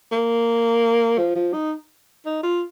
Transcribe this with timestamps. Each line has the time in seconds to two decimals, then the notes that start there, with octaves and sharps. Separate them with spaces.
0.12 A#3
1.18 F3
1.36 F3
1.53 D#4
2.26 D#4
2.43 F4